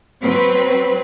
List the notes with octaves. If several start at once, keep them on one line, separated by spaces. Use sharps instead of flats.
F#3 C4 B4